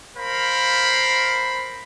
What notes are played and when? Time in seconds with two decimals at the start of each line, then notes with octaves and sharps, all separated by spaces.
0.15 A#4 C5 F5 B5